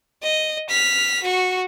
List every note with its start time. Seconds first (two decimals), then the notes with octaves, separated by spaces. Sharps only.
0.23 D#5
0.69 F6 B6
1.23 F#4 C#6